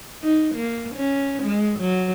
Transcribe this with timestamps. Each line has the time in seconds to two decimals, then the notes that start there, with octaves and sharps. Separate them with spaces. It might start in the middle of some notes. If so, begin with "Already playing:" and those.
0.23 D#4
0.56 A#3
0.95 C#4
1.44 G#3
1.80 F#3